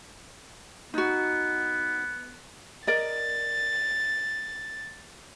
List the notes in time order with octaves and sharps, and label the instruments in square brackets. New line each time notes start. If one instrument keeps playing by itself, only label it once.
[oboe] B3 [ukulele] D#4 F#4
[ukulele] A#4 D5 D#5 [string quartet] A6